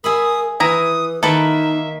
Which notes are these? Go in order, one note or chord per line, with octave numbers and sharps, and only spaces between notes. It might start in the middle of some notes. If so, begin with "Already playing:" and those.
G#4 A#4 E5 B5 D#6
E3 E4 B4 A#5 D#6
D#3 A#3 D#4 A4 B4 E5